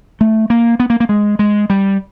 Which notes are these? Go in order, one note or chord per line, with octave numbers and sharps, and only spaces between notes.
A3
A#3
B3
A#3
A#3
G#3
G#3
G3